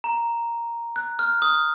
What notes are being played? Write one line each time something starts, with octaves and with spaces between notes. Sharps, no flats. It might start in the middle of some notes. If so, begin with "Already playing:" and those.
A#5
F#6
F6
D#6